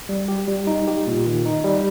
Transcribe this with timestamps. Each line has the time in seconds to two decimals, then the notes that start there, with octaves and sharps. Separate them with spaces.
0.09 G3
0.28 G4
0.48 G3
0.67 D#4
0.88 G4
1.07 A#2
1.26 D#3
1.46 D#4
1.64 G3